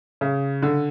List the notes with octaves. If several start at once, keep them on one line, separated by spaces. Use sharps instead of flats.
C#3
D3